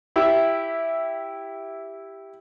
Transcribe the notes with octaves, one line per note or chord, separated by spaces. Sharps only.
E4 G4 E5